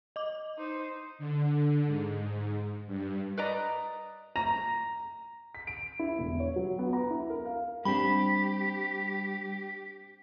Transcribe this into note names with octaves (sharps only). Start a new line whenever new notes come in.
D#5 D6
D#4 C5
D3
G#2
G2
B4 D5 D#5 A#5
A#5
B6
D7
E4
E1
C#5
F#3
B3
A#5
E4
A#4
F5
G3 C4 D4 G4 B5